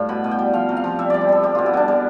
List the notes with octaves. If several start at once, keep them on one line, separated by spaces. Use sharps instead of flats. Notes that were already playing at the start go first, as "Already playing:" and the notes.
Already playing: A2 G3 F5 A5
B2 B5
B2
G5
G3
F3 F5
C3
F5
F3
G3 E5
G3 D5
C5
G3 A4
G3 G4
B2 F4
E4
B2 D4
G3